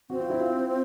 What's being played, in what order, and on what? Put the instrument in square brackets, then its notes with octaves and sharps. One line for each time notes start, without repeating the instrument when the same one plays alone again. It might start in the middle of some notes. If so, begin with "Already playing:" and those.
[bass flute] C4 [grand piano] F#4
[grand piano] F4
E4
F4